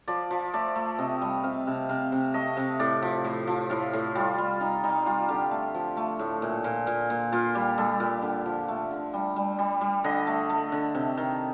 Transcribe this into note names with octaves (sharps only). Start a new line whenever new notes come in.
F3 D5
F3
A3 D5
A3
C3 D#5
G3
C3 F5
C3
C3 F5
C3
A3 D#5
C3
A2 D5
F3
A2
F3
A2 F4
A2
G3 F4
G3
G3 D#4
G3 D#4
G3 F4
D3 G4
A3
F3
A3
A2
A#2
A#2
A#2
A#2
A#2 F4
G3 G4
G3 A4
A#2 F5
D3
F3
A3
D3
G3
G3
G3
G3
D3 D#5
A3
A3
D3
C3
D#3